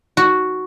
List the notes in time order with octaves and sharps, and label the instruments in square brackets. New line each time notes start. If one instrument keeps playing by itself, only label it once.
[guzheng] F#4